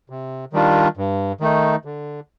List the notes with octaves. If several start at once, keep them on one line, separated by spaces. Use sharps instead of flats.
C3
D#3 G3 D4 F4
G2
D#3 A3 D#4
D3